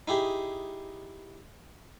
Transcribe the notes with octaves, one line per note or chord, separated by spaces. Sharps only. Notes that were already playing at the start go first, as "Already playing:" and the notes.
D#4 E4 G4 G#4